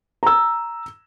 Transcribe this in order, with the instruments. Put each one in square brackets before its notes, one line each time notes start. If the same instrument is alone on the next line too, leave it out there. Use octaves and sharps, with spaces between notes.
[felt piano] A#5 E6